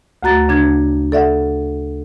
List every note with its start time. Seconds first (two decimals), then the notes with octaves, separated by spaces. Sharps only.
0.23 D2 A3 F#4 A#5 A6
0.49 C#3 D4 G#6
1.12 A4 D5 E5 F#5